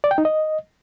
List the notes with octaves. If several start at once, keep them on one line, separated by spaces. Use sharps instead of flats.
D5
G5
D#4
D#5